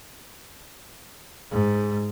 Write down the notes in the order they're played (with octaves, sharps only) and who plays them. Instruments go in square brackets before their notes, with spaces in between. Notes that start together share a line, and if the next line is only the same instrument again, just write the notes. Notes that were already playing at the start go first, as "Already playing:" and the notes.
[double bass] G#2